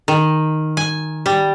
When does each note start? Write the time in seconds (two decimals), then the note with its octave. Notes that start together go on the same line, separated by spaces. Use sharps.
0.08 D#3
0.77 G#5
1.26 G3